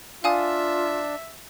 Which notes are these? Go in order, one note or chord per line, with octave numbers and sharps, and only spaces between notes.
D4 F4 E5 F5 G#5 D#6